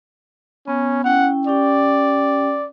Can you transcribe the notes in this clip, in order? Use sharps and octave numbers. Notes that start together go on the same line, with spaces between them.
B3 C#4
C#4 E4 F#5 G5
C#4 G4 D5 G5